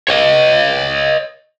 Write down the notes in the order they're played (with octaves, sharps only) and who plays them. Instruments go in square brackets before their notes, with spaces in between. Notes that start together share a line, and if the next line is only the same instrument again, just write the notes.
[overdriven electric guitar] C#5 D#5